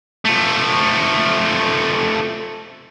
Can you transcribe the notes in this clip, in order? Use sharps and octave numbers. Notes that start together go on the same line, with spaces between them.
F3 A3